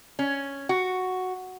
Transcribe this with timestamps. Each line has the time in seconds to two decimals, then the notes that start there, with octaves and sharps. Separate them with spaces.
0.19 C#4
0.69 F#4